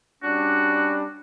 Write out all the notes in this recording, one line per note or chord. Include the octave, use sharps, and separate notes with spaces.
G3 C#4 D4 F#4